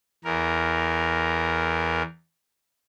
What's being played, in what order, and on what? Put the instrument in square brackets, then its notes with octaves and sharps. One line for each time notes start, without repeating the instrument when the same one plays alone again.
[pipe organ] E2 A#4